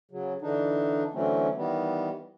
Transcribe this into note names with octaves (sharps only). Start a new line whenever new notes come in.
C#3 F#3
D3 E3 D4 D#4
D3 E3 F#3 A3 C4 C#4
D#3 E3 G3 B3